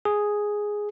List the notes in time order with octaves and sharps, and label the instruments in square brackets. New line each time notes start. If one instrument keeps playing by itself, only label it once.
[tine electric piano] G#4